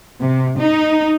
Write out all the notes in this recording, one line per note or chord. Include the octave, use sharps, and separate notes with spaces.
C3
D#4